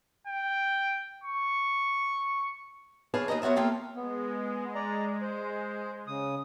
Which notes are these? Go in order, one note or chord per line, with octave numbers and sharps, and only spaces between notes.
G5
C#6
G#4 B4 C#5 D5 F5 A5
D#2 F3 D#5 A#5
B3 F4 F#4 C#5 E5
A#3 F4 A4 E5 F5 G5
G#3 B3
D5 A#5
C5
C#3 D#6